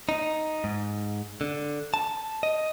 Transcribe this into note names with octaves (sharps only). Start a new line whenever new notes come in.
D#4
G#2
D3
A5
D#5